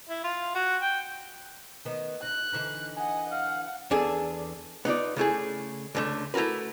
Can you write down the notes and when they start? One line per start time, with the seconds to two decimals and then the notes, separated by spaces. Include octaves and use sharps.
0.09 E4
0.24 F4
0.55 F#4
0.82 G5
1.85 D#3 B3
2.23 D#4 F#6
2.52 D3 E3 D#4
2.97 D#5 F#5 G#5
3.31 F5 F#5
3.91 E2 D4 G#4 A4
4.85 B3 D#4 F4 D5
5.16 C#3 A3 E4 G#4
5.95 C#2 A2 D3 A3
6.34 A3 E4 F#4 A#4 B4